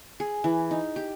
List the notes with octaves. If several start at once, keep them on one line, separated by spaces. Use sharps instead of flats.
G#4
E3
D#4
G4